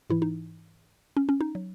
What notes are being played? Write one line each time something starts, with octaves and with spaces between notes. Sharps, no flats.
G#2 E3 E4
D#4
C#4
C#4
D#4
F#3